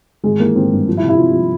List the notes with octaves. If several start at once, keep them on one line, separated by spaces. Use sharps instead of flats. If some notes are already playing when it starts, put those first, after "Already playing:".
G#1 G#3
E3 A#3
G#1 C4
G2
F3
E4
C3
E4
C3 F4
F3